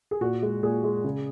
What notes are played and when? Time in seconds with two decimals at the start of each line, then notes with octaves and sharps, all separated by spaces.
0.11 G#4
0.21 A#2 F#4
0.42 G#3
0.63 A#2 G#4
0.84 G#3
1.04 C#3